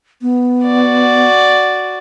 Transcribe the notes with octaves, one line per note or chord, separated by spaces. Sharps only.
B3
F#4 D5